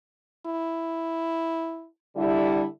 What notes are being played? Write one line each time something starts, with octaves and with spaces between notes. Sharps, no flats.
E4
D3 G3 E4